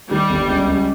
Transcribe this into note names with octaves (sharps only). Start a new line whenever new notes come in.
D#3 G3
G1
C#2
C#2